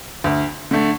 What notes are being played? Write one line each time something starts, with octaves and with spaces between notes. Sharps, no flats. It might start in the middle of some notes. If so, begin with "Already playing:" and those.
D2
D3 A3